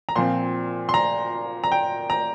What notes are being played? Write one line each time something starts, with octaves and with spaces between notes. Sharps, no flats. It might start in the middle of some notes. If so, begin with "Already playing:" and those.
A#5
A#2 F3 C4 C6
C6
A#5
A#5
G5
A#5